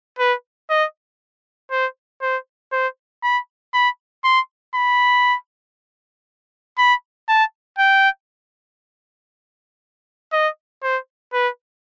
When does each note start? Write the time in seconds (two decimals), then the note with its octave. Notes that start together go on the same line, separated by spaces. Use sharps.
0.19 B4
0.70 D#5
1.71 C5
2.22 C5
2.72 C5
3.23 B5
3.74 B5
4.24 C6
4.75 B5
6.79 B5
7.29 A5
7.79 G5
10.33 D#5
10.83 C5
11.34 B4